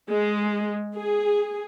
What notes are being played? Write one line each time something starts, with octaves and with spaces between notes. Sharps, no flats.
G#3
G#4